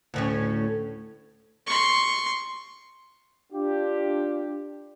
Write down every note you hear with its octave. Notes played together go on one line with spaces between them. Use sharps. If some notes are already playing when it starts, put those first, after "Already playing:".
D2 A2 C#4
C6 C#6
D4 F4 G4